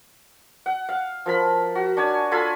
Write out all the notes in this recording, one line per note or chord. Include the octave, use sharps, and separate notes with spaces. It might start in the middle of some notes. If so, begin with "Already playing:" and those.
F#5
F5
F3 A#4 B5
F#4
D4 C#5 G#5
F4 A4 G#5 B5